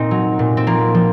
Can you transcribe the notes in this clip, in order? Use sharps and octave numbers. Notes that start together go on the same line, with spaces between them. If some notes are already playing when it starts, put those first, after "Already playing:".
Already playing: A#2 C4 D#4
F#3
A#2
C4
F3 A#3
F3